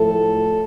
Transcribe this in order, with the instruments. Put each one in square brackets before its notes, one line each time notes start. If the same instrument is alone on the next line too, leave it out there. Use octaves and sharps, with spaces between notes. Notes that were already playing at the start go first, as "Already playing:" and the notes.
Already playing: [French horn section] A2 F3 A3 A4